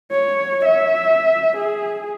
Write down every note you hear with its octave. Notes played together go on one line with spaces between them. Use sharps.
C#5
E5
G#4